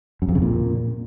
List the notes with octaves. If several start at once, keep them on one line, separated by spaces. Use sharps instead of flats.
F#2
F2
C#3
A#2